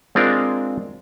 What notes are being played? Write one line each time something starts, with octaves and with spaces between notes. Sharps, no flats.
G#3 C4 D4 F4 A#4